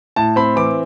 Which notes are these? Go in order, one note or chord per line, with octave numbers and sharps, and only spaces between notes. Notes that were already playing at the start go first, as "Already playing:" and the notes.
A2 A5
C4 B5
E3 D6